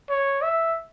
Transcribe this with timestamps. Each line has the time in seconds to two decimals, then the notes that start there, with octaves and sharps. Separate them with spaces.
0.09 C#5
0.42 E5